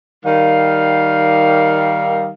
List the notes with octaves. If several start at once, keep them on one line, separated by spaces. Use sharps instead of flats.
D#3 G3 F5